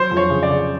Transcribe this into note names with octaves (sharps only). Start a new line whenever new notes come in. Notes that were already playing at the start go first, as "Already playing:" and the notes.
Already playing: F#3 C5
F2
C#5
C#3
D5
C#3